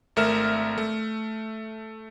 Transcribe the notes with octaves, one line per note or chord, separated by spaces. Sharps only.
G#1 A3 A#4 E5 F6 E7
A3